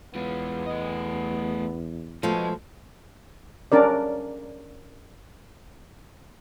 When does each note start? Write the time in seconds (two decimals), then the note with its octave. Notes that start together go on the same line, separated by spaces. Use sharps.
0.15 E2 G#3 B3 F4
0.66 A3 D#5
2.23 B2 F3 G#3 A3 F4
3.72 C#4 D4 A#4 D5